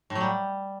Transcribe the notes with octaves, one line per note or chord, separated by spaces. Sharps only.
A2
F#3
G3